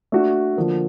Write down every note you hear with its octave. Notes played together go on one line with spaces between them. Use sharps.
A3 D4 F#4
D3 F3 A#3